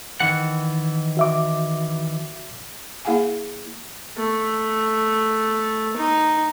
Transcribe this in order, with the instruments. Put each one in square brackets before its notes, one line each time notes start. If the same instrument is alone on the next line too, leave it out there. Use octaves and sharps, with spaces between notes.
[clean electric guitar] D#3 E3 F#5
[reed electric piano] F#4 E5 D6
[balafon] A#3 E4 G#4 F5 F#5 G#5
[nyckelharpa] A3
D#4